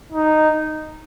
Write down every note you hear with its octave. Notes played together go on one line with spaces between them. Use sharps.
D#4